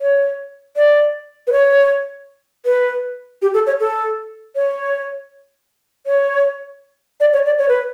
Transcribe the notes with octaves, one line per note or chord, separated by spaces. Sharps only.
C#5
D5
B4
C#5
B4
G4
A4
C#5
A4
C#5
C#5
D5
C#5
D5
C#5
B4